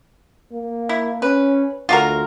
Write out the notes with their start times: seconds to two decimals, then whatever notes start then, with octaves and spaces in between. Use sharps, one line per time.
0.52 A#3
0.89 E4
1.22 C#4 B4
1.89 D2 F4 F#4 A#4